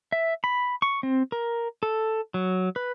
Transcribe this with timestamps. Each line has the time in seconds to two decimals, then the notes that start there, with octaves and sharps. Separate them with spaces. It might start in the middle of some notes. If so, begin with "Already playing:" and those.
0.12 E5
0.44 B5
0.82 C#6
1.03 C4
1.32 A#4
1.83 A4
2.34 F#3
2.76 B4